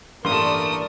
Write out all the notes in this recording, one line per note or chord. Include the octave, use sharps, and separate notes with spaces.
A1 G2 A3 A#3 A#4 D5 C6 D#6